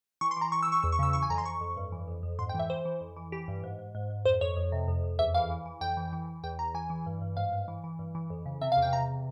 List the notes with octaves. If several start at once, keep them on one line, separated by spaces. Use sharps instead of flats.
E3 C#6
C6
E3 A#5
E3 C#6
E6
E3 C#6
E2 E6
C#6
C#3 E6
E3 C#6
G#5
F2 A#5
C6
F2 C#6
F2
G2
E3
F2
F2
G#2 C6
G5
E3 E5
E3 C5
E3
F2
E3
E3 G4
G2
G#2
G#2
G#2
G#2
F2 C5
F2 C#5
F2
C3
F2
F2
E2 E5
E3 F5
E3
E3
F2 G5
E3
E3
E3
E2 G5
E2 A#5
E3 G#5
E3
G2
G2
G#2 F5
G#2
E3
E3
G2
E3
F2
C#3
C3 E5
F5
E2
G5
C3 A#5